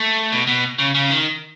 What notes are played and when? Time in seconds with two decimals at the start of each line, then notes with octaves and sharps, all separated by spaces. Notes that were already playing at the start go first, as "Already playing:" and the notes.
Already playing: A3
0.32 B2
0.47 B2
0.79 C#3
0.94 C#3
1.10 D#3